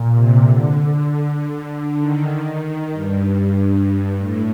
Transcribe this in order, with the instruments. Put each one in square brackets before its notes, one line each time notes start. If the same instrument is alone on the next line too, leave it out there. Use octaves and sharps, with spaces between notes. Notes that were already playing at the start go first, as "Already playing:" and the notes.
Already playing: [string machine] A#2
C3
D3
D3
D3
D#3
G2
A2